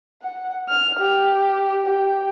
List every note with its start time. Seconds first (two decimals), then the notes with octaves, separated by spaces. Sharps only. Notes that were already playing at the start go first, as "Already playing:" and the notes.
0.22 F#5
0.69 F6
0.99 G4
1.86 G4 G5